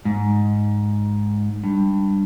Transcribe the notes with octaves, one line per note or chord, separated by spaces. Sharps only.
G#2
G2